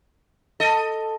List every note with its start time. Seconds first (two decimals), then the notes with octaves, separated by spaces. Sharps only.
0.60 A4 D#5